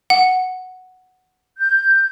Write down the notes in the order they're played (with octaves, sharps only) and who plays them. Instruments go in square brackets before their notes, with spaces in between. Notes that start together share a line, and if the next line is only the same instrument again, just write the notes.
[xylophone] F#5
[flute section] G6